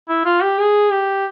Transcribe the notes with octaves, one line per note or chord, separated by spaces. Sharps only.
E4
F4
G4
G#4
G4